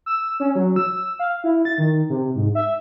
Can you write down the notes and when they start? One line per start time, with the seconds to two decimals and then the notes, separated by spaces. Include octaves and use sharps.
0.06 E6
0.40 C#4
0.55 F#3
0.76 E6
1.19 F5
1.44 E4
1.65 A6
1.78 D#3
2.09 C3
2.36 G#2
2.55 E5